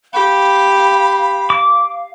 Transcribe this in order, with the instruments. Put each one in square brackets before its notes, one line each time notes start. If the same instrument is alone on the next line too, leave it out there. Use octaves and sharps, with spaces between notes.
[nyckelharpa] G4 [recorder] F5 [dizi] B5
[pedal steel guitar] D6